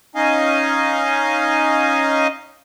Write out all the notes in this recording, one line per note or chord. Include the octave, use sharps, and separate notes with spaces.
C#4 D#4 D#5 F5 G#5